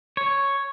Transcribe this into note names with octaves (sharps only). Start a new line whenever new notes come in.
C#5